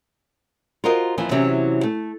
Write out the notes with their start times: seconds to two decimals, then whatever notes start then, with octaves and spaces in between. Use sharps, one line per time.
0.84 F4 F#4 A#4 C5 D#5
1.17 D#2 E3 F3 C4 G#5
1.31 C3 E3 F#3 C4 C#4 G4
1.83 A3